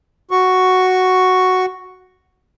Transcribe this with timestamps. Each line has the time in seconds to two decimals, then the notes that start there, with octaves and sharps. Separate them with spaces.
0.31 F#4 C#6